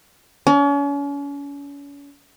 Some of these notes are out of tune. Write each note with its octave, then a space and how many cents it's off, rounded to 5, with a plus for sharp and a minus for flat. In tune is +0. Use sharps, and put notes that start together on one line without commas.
C#4 +40